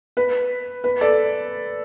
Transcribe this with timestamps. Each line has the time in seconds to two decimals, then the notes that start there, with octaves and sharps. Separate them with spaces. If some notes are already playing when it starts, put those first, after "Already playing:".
0.17 B4
0.84 B4
1.01 A4 D5